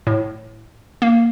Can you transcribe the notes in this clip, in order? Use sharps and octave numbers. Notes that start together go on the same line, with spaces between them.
A2
A#3